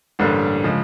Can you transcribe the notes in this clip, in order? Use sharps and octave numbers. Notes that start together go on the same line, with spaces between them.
A1 G2 D3 G3 A#3
C#3 F3 G#3